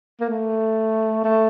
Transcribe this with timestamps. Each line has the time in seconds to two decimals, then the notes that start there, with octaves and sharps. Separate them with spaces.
0.21 A#3
0.29 A3
1.24 A3